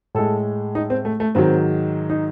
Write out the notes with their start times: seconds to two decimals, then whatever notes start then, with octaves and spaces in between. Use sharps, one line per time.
0.15 A2 G#3 A4
0.75 D#4
0.90 C4
1.05 A3
1.20 A3
1.35 G#2 D#3 F#3 C4
2.10 D#4